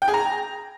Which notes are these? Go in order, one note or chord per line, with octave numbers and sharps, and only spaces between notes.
G5
G#4
A#5